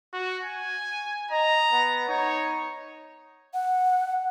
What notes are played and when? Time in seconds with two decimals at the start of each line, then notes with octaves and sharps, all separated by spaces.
0.13 F#4
0.43 G#5
1.31 D#5 A#5
1.72 B3
2.08 D#4 C#5
3.54 F#5